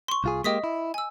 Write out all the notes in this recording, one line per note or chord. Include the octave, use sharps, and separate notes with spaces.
C6 C#6
C2 F4 G#4
G#3 A#3 G4 D#5 D#6 B6
E4
G#5 E6